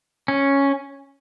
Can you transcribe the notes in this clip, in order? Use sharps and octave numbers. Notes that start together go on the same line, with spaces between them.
C#4